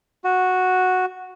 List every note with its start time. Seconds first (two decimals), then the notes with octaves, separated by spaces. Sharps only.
0.24 F#4